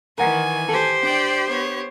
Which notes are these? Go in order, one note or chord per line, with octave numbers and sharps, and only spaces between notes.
D#3 E3 A#4 F#5 G#5
G4 A4 C5
D4 D5 G5
B3 C#5